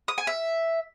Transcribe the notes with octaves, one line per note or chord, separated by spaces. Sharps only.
D#6
G#5
E5